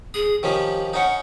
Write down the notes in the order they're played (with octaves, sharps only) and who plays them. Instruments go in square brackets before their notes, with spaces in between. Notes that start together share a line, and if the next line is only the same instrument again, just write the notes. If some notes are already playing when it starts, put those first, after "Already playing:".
[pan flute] G#4 [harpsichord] D#6
[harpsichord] D#3 F3 C#4 [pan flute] G4
[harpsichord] C#4 D#4 [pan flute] F#5